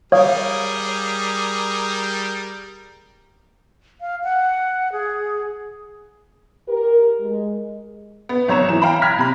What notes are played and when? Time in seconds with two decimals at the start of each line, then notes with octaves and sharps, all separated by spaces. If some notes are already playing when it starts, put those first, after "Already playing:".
0.12 G3 G#4 A#4 C#5 F5 D#6
4.01 F5
4.24 F#5
4.92 G#4
6.68 G4 A#4
7.20 G#3
8.29 B3
8.48 G#1 F#3 C#5 A#5 E7
8.69 E3 E7
8.82 F5 G5 A#5 B5
9.02 F6 G#6 A#6 B6
9.18 C3 B5